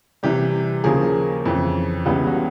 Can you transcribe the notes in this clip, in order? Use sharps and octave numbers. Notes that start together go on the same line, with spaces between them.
C3 E3 G3 G4
D#2 C#3 F3 A#3 G#4
F2 C#3 E3
C#2 C#3 E3 G3 B3
F#4